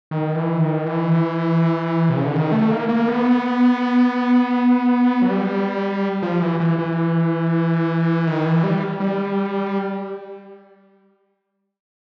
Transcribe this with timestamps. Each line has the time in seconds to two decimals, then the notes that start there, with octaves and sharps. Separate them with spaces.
0.11 D#3
0.36 E3
0.60 D#3
0.86 E3
2.09 C3
2.17 C#3
2.26 D3
2.34 D#3
2.52 A3
2.71 A#3
2.89 A#3
3.08 B3
5.22 F#3
5.30 G3
6.22 F3
6.42 E3
6.60 E3
6.79 E3
8.27 D#3
8.46 E3
8.64 G3
9.00 G3